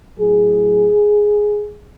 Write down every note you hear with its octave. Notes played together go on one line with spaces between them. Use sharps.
A2 F#3 G#4